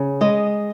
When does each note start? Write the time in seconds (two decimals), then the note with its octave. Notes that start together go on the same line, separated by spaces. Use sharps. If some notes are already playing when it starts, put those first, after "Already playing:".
Already playing: C#3
0.21 G#3 D#5